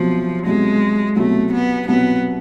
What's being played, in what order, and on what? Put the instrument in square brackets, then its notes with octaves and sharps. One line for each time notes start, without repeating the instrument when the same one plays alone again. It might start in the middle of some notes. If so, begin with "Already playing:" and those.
Already playing: [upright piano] C2 B2 F#3 [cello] F3
[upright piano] C2 B2 F#3 [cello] G#3
[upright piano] C2 B2 F#3 [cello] A3
[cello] B3
[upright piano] C2 B2 F#3 [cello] B3